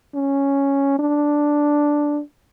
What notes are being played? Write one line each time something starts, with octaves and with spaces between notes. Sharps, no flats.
C#4
D4